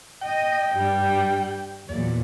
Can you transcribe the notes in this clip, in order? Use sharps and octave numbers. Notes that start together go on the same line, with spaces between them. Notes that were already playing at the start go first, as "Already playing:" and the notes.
D#5 G5
G2 G3
E2 A#2 F#3 D5